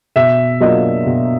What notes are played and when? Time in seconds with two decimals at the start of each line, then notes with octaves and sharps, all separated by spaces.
0.16 B2 E5
0.60 F#3 A#3 D4 F4 D#5
1.06 B2